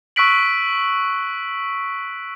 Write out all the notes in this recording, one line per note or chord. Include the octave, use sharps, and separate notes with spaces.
C#6 E6 F#6 B6 D7 F#7